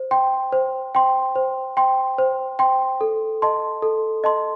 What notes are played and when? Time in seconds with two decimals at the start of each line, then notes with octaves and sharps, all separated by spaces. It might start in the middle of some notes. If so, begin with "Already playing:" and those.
Already playing: C5
0.11 G5 C6
0.52 C5
0.95 G5 C6
1.36 C5
1.77 G5 C6
2.18 C5
2.59 G5 C6
3.01 A4
3.42 D#5 A5 C6
3.82 A4
4.24 D#5 A5 C6